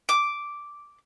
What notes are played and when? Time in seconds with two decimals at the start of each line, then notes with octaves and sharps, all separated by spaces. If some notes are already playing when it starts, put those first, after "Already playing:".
0.09 D6